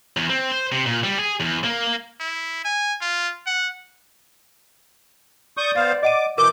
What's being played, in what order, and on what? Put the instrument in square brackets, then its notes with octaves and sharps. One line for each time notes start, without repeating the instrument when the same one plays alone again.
[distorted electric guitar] E2
C4
C5
C3
A#2
G3
G#4
E2
A#3
[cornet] E4
G#5
F4
F#5
[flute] D5 [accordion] C#6 D#6 G6
[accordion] B3 C5 F5 [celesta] A6
[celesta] D#5 F#5 D#7 [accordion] D6
[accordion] B2 E3 G6 [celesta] A#4 [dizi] D6